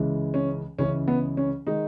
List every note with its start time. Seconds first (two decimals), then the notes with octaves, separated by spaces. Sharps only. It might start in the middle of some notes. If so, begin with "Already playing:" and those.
Already playing: C#2 C#3 E3 G#3
0.34 C#4
0.78 C#2 C#3 E3 G#3 C#4
1.08 B3
1.37 C#4
1.67 D#3 G#3 D#4